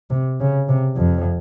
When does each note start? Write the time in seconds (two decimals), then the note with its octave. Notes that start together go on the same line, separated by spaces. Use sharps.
0.10 C3
0.40 C#3
0.69 C3
0.96 F2